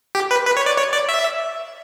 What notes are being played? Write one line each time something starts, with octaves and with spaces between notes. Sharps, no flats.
G4
B4
B4
C#5
D5
C#5
D5
E5